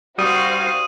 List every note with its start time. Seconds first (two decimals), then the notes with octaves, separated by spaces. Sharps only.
0.19 G3 F#4 C5 F5 D#6 D#7